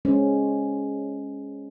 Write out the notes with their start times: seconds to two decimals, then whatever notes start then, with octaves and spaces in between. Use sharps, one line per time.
0.05 G#3 C#4 C5